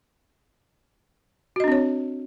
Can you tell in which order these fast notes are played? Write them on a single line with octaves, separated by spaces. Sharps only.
F#4 D#5 D4 C4 C#5